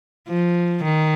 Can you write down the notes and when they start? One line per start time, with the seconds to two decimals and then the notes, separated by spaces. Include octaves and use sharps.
0.28 F3
0.84 D#3